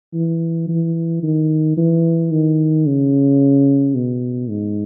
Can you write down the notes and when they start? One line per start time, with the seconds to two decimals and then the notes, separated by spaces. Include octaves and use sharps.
0.14 E3
0.68 E3
1.23 D#3
1.77 E3
2.32 D#3
2.86 C#3
3.95 B2
4.50 G#2